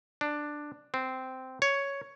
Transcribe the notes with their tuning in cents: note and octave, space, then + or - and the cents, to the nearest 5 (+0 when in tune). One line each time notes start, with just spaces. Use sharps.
D4 +10
C4 -10
C#5 +5